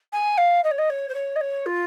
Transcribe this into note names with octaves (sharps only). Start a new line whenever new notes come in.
G#5
F5
D#5
C#5
D#5
C#5
C5
C#5
D#5
C#5
F4